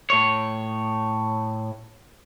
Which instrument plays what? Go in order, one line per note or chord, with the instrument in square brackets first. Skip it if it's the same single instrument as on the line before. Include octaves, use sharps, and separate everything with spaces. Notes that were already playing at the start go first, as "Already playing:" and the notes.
[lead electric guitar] A2 C#5